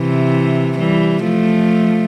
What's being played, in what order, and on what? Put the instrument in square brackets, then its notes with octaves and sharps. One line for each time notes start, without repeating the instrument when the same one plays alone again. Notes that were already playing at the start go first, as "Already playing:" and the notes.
Already playing: [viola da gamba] C3 E3
E3 G3
F3 A3